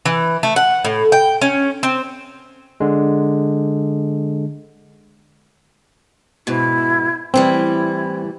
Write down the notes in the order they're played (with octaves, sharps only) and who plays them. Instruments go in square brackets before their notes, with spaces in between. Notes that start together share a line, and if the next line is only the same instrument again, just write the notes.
[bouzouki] E3
A3
F#5
A2
G5
C#4
C4
[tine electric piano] D3 G#3
[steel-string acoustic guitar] G#2 B2 [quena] E4
[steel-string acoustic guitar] A2 E3 G3 [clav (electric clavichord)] C4 [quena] E4